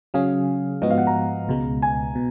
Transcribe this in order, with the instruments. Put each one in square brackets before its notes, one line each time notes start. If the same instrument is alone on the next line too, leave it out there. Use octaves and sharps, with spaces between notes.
[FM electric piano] C#3 F#3 C#4 G#4 [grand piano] F5
[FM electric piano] G#2 F3 B3 F#4 [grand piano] D#5
[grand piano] F5
F#5
A#5
[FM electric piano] C#2 B2 G#3
[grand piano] G#5
[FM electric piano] B2